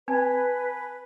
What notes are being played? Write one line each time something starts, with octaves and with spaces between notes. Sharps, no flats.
C4 B4 G#5 A5 G#6